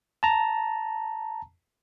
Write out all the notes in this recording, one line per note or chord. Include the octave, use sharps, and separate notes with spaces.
A5 A#5